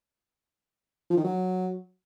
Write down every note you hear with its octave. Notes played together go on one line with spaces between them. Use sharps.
F3
D#3
F#3